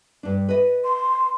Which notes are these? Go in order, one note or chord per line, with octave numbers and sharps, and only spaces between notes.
G2 D4
B4 D#5
C6